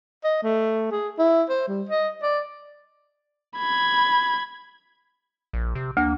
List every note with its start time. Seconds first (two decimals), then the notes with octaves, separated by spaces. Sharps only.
0.24 D#5
0.43 A3
0.92 G#4
1.19 E4
1.50 C5
1.68 G3
1.89 D#5
2.23 D5
3.58 B5 G#6
5.53 A#1
5.75 C3
5.97 D2 A#3